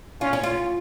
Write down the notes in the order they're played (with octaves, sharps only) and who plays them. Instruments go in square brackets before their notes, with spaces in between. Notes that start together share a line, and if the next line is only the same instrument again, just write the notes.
[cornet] C#4 [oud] F4
[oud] C#4
F4